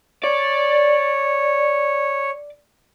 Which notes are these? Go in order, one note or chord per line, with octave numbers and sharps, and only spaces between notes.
C#5 D5